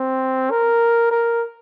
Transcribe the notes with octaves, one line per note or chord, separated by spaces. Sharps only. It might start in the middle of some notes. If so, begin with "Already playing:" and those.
Already playing: C4
A#4
A#4